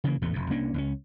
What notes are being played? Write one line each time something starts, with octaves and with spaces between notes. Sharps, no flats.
C#3 E3 A#3
A1 E2 C3 A3
F1 F2
C2 A#3 C#4 D4
C#2 C4 C#4